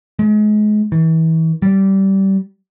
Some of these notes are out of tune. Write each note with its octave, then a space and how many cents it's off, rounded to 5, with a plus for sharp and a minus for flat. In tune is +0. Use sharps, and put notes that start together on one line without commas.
G#3 +30
E3 -35
G3 -20